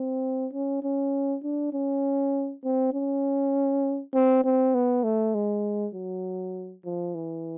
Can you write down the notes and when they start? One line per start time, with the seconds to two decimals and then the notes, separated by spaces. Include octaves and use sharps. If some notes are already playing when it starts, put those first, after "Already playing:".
Already playing: C4
0.53 C#4
0.83 C#4
1.43 D4
1.73 C#4
2.64 C4
2.94 C#4
4.14 C4
4.44 C4
4.74 B3
5.04 A3
5.34 G#3
5.95 F#3
6.85 F3
7.15 E3